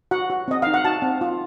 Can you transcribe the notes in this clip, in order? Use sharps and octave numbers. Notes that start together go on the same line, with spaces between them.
F#4 F#5
F#4
C4 D#5
D#4 F5
F#5
F#4 A5
C4
F4